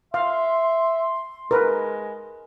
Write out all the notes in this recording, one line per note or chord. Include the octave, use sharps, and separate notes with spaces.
E5 F5 C6
G#3 A#4 B4